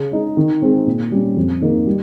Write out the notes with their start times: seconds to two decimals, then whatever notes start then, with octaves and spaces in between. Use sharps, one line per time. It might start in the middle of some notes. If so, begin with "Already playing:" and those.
Already playing: C#3
0.11 G#3 D#4
0.37 D#3
0.62 G#3 C4 D#4
0.87 A#2
1.12 G3 C#4
1.37 F2
1.61 D#3 A#3 D#4
1.87 G3